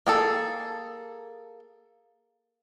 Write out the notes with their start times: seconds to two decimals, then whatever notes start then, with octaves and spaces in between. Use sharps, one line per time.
0.06 A#3 G#4 A4